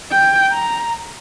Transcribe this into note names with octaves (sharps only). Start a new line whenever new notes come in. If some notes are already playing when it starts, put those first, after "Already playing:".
G5
A#5